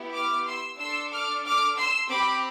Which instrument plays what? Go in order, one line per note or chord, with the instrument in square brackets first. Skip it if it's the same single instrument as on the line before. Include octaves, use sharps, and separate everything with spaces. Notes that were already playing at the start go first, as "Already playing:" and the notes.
Already playing: [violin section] B3 E4 G4
D6 F6
C6 E6
D4 A4 C6 E6
D6 F6
D6 F6
C6 E6
C4 G4 B5 D6